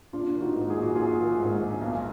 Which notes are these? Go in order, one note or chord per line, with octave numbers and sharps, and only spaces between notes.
A#1 D4 F4
D#3 F4
D#4 F#4
G#2
G#4
A#1
F#4
A#1 F4 G#4
D#3
G#2
A#1
B1